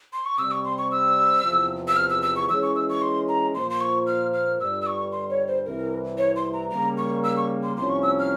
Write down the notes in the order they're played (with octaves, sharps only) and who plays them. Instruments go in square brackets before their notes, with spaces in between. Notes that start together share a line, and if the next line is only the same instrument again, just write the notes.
[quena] C6
C#6
[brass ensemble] C3 G3 C4 [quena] E6
[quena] C#6
C6
C#6
E6
[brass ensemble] E2 C3 F3
[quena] E6
F6
E6
E6
C#6
[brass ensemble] E3 G#3 C#4 [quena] E6
[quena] C#6
E6
C#6
C6
A#5
[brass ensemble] A#2 F3 A#3 F4 C5 [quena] C6
[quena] C6
C#6
F6
F6
[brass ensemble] G1 G2 G3 [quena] E6
[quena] E6
C#6
C6
C#5
C5
[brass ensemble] C2 C3 E3 [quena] A#4
[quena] C#5
C6
A#5
[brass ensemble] C#3 G3 A#3 [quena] A#5
[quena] C#6
E6
C#6
C6
[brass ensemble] C2 C3 F3 A#3 C#4 [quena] C6
[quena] C#6
E6
F6